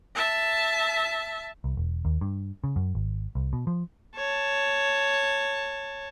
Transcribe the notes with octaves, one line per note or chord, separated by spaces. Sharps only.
E5 A5
C2
E1
D#2
G2
C#3
F#2
G#1
C2
B2
F3
C#5 A5